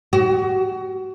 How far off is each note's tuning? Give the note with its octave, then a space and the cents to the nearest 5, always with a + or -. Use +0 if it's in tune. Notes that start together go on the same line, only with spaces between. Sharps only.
F#4 +25